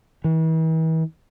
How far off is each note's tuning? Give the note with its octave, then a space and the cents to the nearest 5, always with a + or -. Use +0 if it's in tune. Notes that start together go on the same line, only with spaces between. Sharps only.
E3 -40